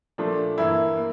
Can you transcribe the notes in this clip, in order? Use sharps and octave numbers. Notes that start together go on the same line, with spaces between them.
A#2 F3 A3 D4
G2 E3 A#3 E4
A#3